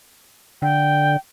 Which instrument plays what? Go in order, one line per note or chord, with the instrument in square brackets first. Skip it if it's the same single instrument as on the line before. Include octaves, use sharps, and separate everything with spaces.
[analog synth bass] D3 [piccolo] G5